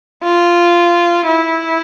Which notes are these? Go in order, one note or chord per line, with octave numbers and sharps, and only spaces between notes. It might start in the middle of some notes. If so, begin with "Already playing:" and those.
F4
E4